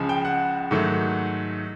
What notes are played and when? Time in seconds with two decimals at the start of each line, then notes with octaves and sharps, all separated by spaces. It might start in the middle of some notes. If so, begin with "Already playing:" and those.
Already playing: C#2 C#3 F3 G#3
0.09 G5
0.25 F#5
0.71 G#2 D#3 F#3 A3